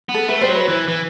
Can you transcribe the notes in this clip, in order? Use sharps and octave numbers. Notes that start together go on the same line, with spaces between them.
B3
A4
A3 B4
G3 C5
F#3
B4
E3
E3